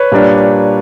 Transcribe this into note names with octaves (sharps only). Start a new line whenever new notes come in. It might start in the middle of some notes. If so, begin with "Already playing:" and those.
Already playing: B4 C#5
A#2 G3 A#3 D4